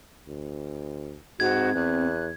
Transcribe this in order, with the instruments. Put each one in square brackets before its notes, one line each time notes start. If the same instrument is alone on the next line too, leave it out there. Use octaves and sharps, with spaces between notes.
[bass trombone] D2
[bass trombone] G#2 [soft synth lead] C4 [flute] F#4 [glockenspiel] G#6
[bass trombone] E2 [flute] F#6